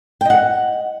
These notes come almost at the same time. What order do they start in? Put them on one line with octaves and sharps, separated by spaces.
G5 D#5 F#5